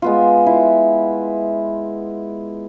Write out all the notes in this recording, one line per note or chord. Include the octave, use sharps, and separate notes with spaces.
G#3 B3 F4
E4